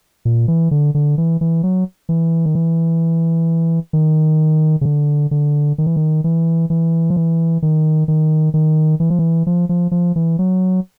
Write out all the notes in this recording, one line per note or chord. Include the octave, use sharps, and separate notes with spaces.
A#2
E3
D3
D3
E3
E3
F#3
E3
D#3
E3
D#3
C#3
D3
D3
D#3
E3
D#3
E3
E3
F3
E3
D#3
D#3
D#3
E3
F3
E3
F3
F3
F3
E3
F#3